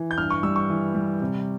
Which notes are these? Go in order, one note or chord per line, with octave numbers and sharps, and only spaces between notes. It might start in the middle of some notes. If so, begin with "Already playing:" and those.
Already playing: E3
G6
G2 F6
C#6
G3 E6
C#6
E3
G3
C3